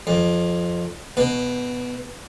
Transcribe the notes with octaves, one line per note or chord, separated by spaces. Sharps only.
F2
B2